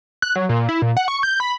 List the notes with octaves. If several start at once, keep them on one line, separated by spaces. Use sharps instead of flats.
F#6
F#3
A#2
E4
A#2
F#5
C#6
G6
B5